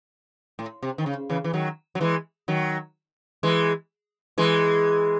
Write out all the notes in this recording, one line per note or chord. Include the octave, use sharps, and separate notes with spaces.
A2
C3
D#3
C#3
C#3 E3
E3
D#3 F#3
F#3
E3 G#3
D#3 F#3
E3 G#3
E3 G#3